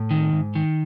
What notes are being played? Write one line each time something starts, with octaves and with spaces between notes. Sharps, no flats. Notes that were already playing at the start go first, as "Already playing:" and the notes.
Already playing: A2
D#3
G#2
D#3